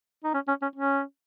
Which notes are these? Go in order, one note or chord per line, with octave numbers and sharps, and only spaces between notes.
D#4
C#4
C#4
C#4
C#4